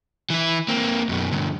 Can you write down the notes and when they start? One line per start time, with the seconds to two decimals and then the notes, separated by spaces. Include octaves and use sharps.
0.30 E3 E4
0.68 A#3 C4
1.09 F#2 B2
1.32 D2 G2